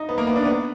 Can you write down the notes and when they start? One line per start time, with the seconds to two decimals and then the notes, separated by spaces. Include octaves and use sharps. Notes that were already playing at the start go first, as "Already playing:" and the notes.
Already playing: D#4
0.09 B3
0.18 A#3
0.27 B3
0.36 D4
0.45 B3